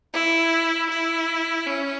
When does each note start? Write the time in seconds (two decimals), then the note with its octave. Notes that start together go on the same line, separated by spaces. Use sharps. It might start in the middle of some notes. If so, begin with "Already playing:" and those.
0.13 E4
0.90 E4
1.67 C#4